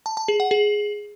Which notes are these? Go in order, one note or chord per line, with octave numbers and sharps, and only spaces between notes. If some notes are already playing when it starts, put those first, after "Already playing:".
A5
A5
G#4
F#5
G#4